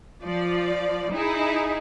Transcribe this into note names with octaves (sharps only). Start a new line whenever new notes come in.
F3 D5
D#4 E4 G#4